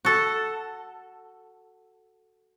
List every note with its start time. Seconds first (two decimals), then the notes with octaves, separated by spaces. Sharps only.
0.05 F#4 A4